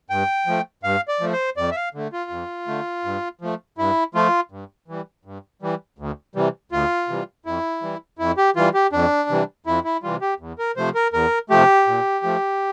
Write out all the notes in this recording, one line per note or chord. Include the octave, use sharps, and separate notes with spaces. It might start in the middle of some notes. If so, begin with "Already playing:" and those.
G2 G5
F3 A3
G2 F5
D5
F3 A3
C5
F2 D5
E5
F5
D3 A3
F4
F2
D3 A3
G2
F3 A3
G2 E4
F3 A3 F4
G2
E3 G3
G2
E3 G3
D2
C3 E3 G3
D2 F4
C3 E3 G3
F2 E4
E3 G3
F2 E4
G4
E3 G3 F4
G4
F2 D4
C3 E3 G3
F2 E4
E4
C3 E3 G3 F4
G4
E2
A#4
C3 F3 A3 C5
A#4
E2 A#4
C3 F3 A3 G4
A#2
F3 A3